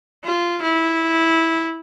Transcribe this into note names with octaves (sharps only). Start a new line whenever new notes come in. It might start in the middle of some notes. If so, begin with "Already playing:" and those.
F4
E4